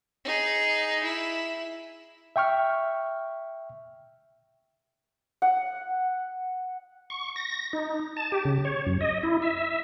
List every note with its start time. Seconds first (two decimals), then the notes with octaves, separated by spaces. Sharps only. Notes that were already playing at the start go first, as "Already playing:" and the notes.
0.24 D#4 G#4
1.04 E4
2.36 E5 G5 C#6 F6
5.42 F#5
7.10 C#6
7.36 A#6
7.73 D#4
8.17 A5
8.32 G4
8.45 C#3
8.65 C#5
8.87 F#2
9.01 D#5
9.23 E4
9.42 E5